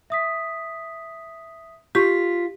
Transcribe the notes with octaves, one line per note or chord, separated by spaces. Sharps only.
E5 D#6 B6
F4 G4 C#6 B6